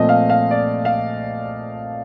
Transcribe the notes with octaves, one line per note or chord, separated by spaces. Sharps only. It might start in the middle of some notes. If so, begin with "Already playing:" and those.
Already playing: A#2 F3 A3 C4 D#5
F5
F5
D5
F5